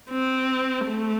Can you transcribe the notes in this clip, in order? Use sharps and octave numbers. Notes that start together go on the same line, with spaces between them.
C4
A3